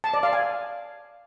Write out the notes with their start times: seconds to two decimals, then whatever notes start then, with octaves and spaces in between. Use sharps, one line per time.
0.04 A5
0.14 D5
0.23 F5
0.33 G#5